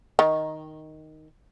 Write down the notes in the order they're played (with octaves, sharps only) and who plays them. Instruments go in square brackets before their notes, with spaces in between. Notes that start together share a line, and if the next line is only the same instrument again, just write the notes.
[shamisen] D#3